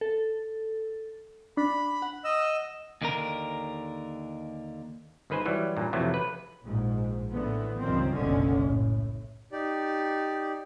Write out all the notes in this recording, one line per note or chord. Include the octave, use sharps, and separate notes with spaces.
A4
D4 B5
F#5
D#5 E6
D#2 D3 A#4
G1 D#3 B4 C5 G#5
E3 F#3 G3
G2 A#2
F2 C3 E3 F#3 A3
B4
A#1 G#2
A2 D3 E3 B3
C#2 G2 D#3 F3 C4
F#1 B1 D3 G#3 C#4
A2
D#4 G4 D5